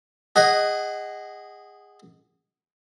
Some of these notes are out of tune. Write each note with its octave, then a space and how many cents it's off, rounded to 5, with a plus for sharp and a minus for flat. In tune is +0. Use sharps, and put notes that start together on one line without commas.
G#4 -20 D#5 +0 F#5 +15